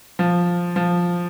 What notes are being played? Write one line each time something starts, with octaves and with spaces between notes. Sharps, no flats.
F3
F3